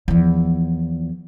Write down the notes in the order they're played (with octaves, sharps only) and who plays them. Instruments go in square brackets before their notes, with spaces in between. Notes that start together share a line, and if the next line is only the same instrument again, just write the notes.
[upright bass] E2 F3